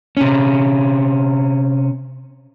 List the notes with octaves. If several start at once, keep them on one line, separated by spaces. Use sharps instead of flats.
C3 C#4